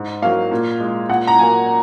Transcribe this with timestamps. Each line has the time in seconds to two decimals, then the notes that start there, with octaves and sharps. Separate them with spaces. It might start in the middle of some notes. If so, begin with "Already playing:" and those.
Already playing: G#2
0.22 F#3 A#3 F5
0.51 A#2
0.80 G#3
1.09 A#2 F#5
1.27 A#5
1.39 F#3 A#3 G#5